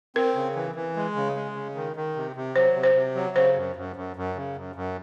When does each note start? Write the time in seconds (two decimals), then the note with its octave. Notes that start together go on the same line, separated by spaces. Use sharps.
0.16 C4 A#4
0.35 C#3
0.55 E3
0.75 E3
0.96 G#3
1.15 C#3
1.36 G#3
1.56 C#3
1.75 D#3
1.96 D#3
2.16 C3
2.36 C3
2.56 F#3 C5
2.76 C3
2.83 C5
2.95 C3
3.15 F#3
3.36 C#3 C5
3.56 F#2
3.76 F#2
3.96 F#2
4.16 F#2
4.35 C#3
4.56 F#2
4.76 F#2